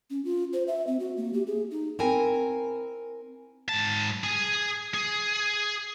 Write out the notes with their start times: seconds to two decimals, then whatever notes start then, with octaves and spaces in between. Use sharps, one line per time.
0.10 C#4
0.25 F4
0.53 C5
0.68 E5
0.87 C4
1.00 F#4
1.17 A#3
1.34 G4
1.47 G#4
1.71 D#4
1.99 C4 E4 A#4 G#5
3.69 G#2 A5
4.24 G#4 G#5
4.94 G#4